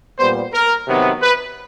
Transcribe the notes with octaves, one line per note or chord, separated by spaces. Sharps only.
A#2 G3 B3 C5
A#4
C3 D#3 F#3 B3
B4